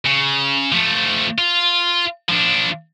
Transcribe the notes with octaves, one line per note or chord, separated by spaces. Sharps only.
C#3
F3 A3
F4
F3 D4